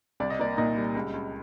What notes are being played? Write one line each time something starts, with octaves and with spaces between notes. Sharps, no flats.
C2 D5
D#5
A#3 D5
A#2 D#4 D#5
G3
C#2
C#2